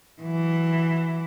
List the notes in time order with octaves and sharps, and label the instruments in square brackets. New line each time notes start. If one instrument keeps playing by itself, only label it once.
[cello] E3 F#3